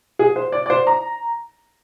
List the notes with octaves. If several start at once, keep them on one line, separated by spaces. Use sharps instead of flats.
G#4
C5
D5
D5
C5
A#5